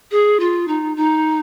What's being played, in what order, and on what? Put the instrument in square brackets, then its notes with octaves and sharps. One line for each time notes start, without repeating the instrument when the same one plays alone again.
[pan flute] G#4
F4
D#4
D#4